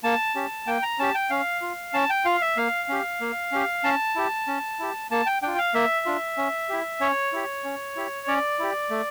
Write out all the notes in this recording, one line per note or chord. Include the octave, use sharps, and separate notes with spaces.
A#3 A5
C#4 G4
A#3 G5
A#5
C#4 G4 A5
G5
C#4 F5
F4
C#4 A5
G5
F4 F5
E5
A#3 F5
C#4 G4
A#3
C#4 G4
C#4 A5
E4 G4
C#4
E4 G4
A#3 A5
G5
D4 F4 G5
F5
A#3 E5
D4 F4
C#4
E4 G4
C#4 C#5
E4 G4
C#4
E4 G4
C#4 D5
E4 G4
A3